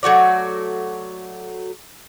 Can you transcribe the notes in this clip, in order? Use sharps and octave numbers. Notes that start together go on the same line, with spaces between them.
F#3 A3 F#4 D5